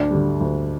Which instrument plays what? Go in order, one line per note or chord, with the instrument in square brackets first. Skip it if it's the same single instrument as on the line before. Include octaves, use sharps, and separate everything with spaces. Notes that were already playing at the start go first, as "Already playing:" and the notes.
Already playing: [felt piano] D2 [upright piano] D4
[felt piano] D3 G3
D2